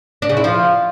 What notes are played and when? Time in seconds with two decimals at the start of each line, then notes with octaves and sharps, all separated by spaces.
0.22 D4
0.29 C#3
0.37 E4
0.44 F3